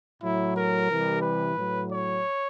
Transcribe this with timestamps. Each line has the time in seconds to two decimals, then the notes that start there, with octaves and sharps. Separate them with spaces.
0.20 A2 F#3 E4
0.54 A#4
0.88 C3 E3 G3
1.22 B4
1.56 A2 F#3
1.90 C#5